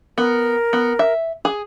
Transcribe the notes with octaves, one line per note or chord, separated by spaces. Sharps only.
B3 A#4
B3
E5
G#4